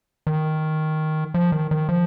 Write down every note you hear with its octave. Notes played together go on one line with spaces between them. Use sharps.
D#3
F3
D#3
D#3
F3